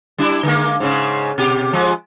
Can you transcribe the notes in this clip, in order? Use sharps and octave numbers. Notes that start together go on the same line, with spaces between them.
G3 D4 E4
D3 G#3 A#3
G#2 C#3
B2 G4
F3 G#3